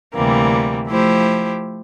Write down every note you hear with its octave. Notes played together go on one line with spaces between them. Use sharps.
D2 C3 E3 G3 A#3
F3 A3 E4 G4 C5